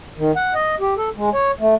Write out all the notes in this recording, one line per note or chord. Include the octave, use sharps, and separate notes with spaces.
D#3
F#5
D#5
G4
A4
G#3
C#5
A3